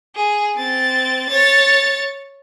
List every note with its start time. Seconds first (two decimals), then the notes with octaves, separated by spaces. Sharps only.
0.16 G#4
0.56 C4 A6
1.27 C#5 A6